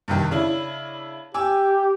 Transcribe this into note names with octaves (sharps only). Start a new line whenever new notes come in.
G2 C3 D#3
C#3 D4 E4
G4 G#5 D6 E6